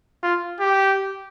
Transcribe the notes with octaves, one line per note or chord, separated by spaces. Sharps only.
F4
G4